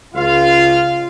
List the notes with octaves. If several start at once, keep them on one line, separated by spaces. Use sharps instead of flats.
C#2 F4 F5